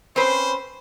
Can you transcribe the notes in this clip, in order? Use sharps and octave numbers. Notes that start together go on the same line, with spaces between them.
C4 C#4 B4 C5